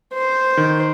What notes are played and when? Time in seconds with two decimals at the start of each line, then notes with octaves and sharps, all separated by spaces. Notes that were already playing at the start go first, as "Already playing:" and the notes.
0.13 C5
0.57 D#3